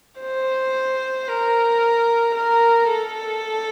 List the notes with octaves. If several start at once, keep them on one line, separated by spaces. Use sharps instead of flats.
C5
A#4
A#4
A4